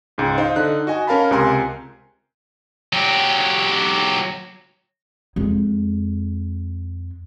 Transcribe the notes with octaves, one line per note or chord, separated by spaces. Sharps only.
C#2 G#2
D#4 C5 F5
D3 D#4 F#6
F#4 D#5 G#5
C#4 A#4 F5 A5 B5
C#2 C3 A#4 G#5 A#5 C6
F#3 G4
F2 G#3